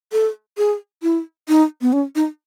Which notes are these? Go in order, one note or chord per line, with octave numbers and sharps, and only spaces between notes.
A4
G#4
E4
D#4
B3
C#4
D#4